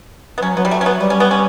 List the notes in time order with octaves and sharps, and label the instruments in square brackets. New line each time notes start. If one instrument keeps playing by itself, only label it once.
[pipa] B3
[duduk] F#3 [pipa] C#4
[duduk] F#3 [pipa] B3
[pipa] G3
A3
C#4
B3
[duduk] G3 [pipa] B3
[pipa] C#4
B3
C#4